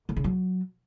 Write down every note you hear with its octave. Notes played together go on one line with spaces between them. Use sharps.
D3
C#3
F#3